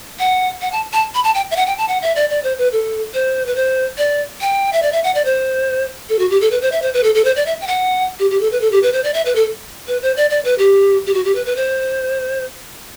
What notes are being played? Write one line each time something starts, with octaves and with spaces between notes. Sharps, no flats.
F#5
F#5
A5
A5
B5
A5
G5
E5
F#5
G5
A5
F#5
E5
D5
D5
C5
B4
A4
C5
B4
C5
D5
G5
E5
D5
E5
F#5
D5
C5
A4
F#4
G4
A4
B4
C5
E5
C5
B4
A4
A4
C5
D5
E5
G5
F#5
G4
G4
A4
B4
A4
G4
B4
C5
D5
E5
B4
A4
B4
C5
D5
D5
B4
G4
G4
F#4
G4
B4
B4
C5